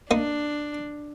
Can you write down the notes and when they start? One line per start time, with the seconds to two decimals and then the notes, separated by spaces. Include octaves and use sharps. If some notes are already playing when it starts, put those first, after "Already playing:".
0.11 A#3 D4 D#4